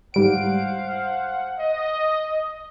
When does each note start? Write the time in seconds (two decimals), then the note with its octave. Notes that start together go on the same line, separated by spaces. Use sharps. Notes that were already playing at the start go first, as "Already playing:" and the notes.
0.14 G#2 G3 C5 F5 F#5 D7
1.58 D#5